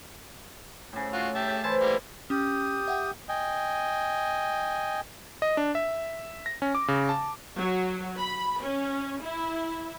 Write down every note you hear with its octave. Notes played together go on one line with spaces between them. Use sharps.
A2 C#3
F4 F#4
G4 E5 A5
E3 E4 C5 A5
G3 A#3
C#4 G4 D#6
E5 F#5 G5
D#5 G5 G#5
D#5
D4
E5
A#6
C#4
D6
C#3
A5
F#3
B5
C#4
E4